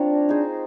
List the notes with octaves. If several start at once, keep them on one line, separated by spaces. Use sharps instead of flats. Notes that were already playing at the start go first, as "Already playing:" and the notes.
Already playing: C4 D4 F4 A#4 C#5
D#4 G#4 C5